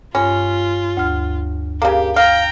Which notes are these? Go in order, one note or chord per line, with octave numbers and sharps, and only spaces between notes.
G2 C#4 F4
D2 F6
C#3 A#3 G4
F5 G5 A#5 F6